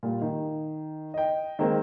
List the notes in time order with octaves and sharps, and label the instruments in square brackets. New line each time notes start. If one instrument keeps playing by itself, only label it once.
[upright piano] A#2 G3
D#3
D#5 G5
D#3 G#3 A#3 C4